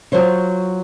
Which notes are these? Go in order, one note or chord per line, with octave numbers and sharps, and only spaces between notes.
F#3 F4 C5 C#5